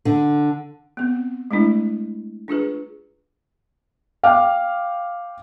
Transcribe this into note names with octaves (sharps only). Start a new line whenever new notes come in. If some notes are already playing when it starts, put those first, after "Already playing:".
D3
B3 C4
G#3 A3 D4 E4
D4 F4 G#4 B4
F5 G5 D6 F6